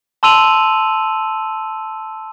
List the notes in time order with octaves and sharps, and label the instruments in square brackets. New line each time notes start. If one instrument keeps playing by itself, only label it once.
[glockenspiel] A5 C6 E6 D#7 F7 F#7